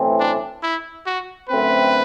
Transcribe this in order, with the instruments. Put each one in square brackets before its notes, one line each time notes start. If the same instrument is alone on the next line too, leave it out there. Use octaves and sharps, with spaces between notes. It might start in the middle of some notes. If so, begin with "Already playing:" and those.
Already playing: [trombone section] B1 A2 E3 A3 C4
[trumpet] D4
E4
F#4
[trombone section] F#2 D3 A3 C4 [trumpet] B4